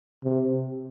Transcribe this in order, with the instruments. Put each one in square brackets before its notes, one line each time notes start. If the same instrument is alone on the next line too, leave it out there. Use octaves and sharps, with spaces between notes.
[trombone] C3